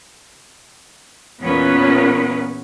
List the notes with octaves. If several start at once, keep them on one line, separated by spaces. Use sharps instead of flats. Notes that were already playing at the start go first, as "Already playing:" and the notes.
E2 A#2 B3 C#4 B4